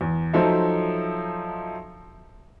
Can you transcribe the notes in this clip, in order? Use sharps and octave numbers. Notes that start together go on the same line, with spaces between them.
E2
F3 F#3 D#4 A4 C5 E5